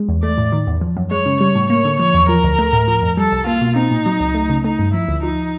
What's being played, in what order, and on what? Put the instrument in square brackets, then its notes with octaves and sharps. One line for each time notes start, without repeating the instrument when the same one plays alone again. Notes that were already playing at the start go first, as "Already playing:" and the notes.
Already playing: [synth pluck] G#3
E2
[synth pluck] A3 [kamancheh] D5
[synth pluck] A2
D#3
E2
F3
F#2
[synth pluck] G#3 [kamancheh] C#5
[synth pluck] C#3
[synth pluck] G3 [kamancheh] C#5
[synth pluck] A2
[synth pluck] A#3 [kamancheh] C#5
[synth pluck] D3
[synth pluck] F3 [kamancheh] C#5
[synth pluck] E2
[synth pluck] F3 [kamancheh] A#4
[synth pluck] D2
A3
A2
F3
F2
[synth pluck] G3 [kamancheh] A4
[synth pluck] C2
[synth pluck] A#3 [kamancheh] F4
[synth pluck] B2
[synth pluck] C4 [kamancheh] D#4
[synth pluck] A#2
F#3
C#2
A3
C#3
[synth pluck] A3 [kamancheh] D#4
[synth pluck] G2
[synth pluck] F3 [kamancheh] E4
[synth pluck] D2
[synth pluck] F3 [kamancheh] D#4